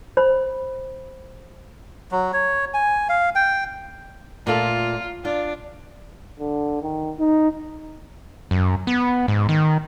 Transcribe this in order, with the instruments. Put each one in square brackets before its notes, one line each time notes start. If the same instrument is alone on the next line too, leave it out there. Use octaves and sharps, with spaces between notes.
[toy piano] C5 B5
[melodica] F#3
C#5
G#5
F5
G5
[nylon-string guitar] A#2 A3 A4 [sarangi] F4
[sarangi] D4 [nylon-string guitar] F4
[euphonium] D3
D#3
D#4
[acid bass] F#2
B3
G#2
D#3